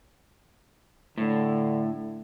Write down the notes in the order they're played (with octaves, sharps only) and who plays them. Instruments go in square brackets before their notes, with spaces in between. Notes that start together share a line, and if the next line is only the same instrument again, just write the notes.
[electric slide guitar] A2 [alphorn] D3